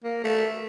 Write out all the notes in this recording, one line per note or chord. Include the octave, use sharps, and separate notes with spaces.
A#3
A3